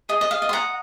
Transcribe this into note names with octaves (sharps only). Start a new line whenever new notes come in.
G#4 D#5
D#5
F5
D#5
C6
F#5 A#5